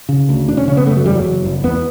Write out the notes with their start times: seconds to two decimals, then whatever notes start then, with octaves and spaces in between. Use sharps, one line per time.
0.09 C#3
0.29 D2
0.48 E1 D4
0.57 C#4
0.68 C#3 C#4
0.77 B3
0.86 F#1 A3
0.97 F#3
1.06 E2 G3
1.16 F#3
1.25 F#1
1.45 F#1
1.64 E2 B3